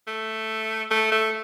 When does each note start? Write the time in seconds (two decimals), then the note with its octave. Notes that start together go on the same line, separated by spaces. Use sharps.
0.07 A3
0.91 A3
1.12 A3